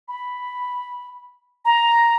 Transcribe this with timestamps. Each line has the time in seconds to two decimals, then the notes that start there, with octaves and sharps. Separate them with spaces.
0.08 B5
1.65 A#5